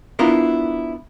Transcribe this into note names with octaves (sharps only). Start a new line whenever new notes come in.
B3 D4 E4 F4 A#4